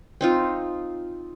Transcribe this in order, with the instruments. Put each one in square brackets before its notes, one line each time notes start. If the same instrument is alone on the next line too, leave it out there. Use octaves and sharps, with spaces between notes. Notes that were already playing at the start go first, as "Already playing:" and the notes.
[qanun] C4 D#4 F4